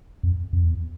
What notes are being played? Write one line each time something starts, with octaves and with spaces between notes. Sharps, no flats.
F2
F2
E2